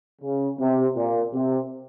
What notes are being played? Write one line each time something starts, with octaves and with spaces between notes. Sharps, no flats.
C#3
C3
A#2
C3